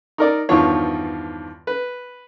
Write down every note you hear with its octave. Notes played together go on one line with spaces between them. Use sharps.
D#4 A#4 D5
E2 G2 D#3 F3 F4 C#5
B4